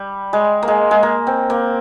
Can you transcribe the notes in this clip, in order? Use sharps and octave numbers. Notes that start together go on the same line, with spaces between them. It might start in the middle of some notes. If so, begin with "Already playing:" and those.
Already playing: G3
G#3
A#3
G#3
G#3
A#3
C4
A#3